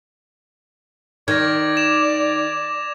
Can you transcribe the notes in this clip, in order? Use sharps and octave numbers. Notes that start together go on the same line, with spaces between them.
D#3 D5 G#6 A#6
D6 E7 F7